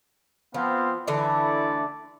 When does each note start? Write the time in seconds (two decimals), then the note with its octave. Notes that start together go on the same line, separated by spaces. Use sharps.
0.54 F3 B3 C4 F5
1.07 D3 E3 A3 E4 D5